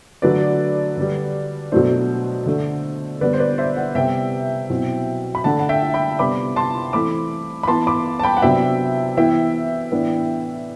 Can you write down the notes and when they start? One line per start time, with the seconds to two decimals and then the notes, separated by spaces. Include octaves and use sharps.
0.22 D3 F#3 A3 D4 B4 D5
0.97 D3 G3 D4
1.72 B2 F#3 A3 D4 C5
2.46 D3 A3 D4
3.21 D3 G3 B3 B4 D5
3.33 C5
3.39 B4 D5
3.58 C5 E5
3.76 D5 F#5
3.95 C3 G3 B3 E5 G5
4.70 B2 F#3 C4 E4
5.35 B5
5.44 D3 A3 D4 F#5 A5
5.59 F#5
5.69 E5 G5
5.94 G5 B5
6.19 C3 G3 B3 D4 B5 D6
6.56 A5 C6
6.93 E3 A3 C4 B5 D6
7.63 B5
7.68 E3 B3 E4 A5 C6
7.87 B5 D6
8.19 A5
8.23 G5 B5
8.37 F#5
8.42 C3 F#3 B3 D4 E5 G5
9.17 E3 B3 E4 E5 G5
9.92 A2 E3 B3 D4